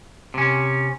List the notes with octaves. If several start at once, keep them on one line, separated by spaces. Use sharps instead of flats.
C3 C#4